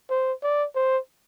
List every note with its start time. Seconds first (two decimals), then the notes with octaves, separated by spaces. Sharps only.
0.10 C5
0.43 D5
0.75 C5